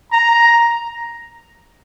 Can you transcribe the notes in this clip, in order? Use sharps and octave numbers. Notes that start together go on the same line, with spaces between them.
A#5